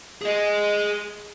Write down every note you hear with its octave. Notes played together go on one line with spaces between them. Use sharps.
G#4 D#5